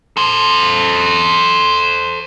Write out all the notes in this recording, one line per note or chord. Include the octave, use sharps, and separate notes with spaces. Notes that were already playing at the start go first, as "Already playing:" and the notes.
A4 C5